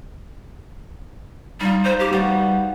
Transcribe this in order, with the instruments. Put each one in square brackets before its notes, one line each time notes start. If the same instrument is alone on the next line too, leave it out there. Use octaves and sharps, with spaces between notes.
[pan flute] G3 [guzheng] D#4 F4
[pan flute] C5
G4
[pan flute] G3 [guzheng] B3 F#4 G4